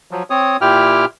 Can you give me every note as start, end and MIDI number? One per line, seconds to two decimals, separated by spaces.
0.11 0.23 53
0.11 0.23 54
0.30 0.57 60
0.30 0.57 73
0.30 0.57 87
0.61 1.05 46
0.61 1.05 64
0.61 1.05 67
0.61 1.05 79
0.61 1.05 89